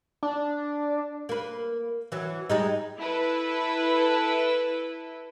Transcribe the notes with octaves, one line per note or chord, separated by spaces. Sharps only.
D4
A#3 B4
E3 F#3
G3 G#3 D#4
E4 A4 B4